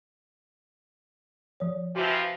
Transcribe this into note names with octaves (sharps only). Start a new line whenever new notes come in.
F3 C#5
C3 E3 F3 F#4